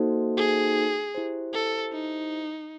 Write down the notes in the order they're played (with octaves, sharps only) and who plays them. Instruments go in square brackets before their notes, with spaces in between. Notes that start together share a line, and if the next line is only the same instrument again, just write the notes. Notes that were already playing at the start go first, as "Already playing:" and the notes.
Already playing: [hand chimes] A#3 D#4 F#4 A4 C5
[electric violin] G#4
[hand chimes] E4 G4 C5
[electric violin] A4
D#4